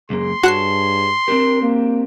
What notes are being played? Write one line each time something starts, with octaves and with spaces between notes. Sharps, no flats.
C#2 F#2 A#3 G#4 C6
G2 F#4 G#4 C#5 A5 F#6 C7
C4 D4 G4 A#4
A#3